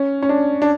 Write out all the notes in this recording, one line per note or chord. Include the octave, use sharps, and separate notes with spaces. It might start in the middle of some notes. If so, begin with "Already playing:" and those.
Already playing: C#4
C#4
D4
D4